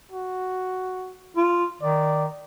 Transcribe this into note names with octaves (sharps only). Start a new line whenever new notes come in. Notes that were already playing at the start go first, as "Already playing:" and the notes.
F#4
F4
D#3 D5